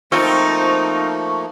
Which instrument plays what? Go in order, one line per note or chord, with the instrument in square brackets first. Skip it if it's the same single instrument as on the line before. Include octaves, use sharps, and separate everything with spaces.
[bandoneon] F3 A3 A#3 [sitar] C4 F4 [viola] D#4 [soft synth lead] C#6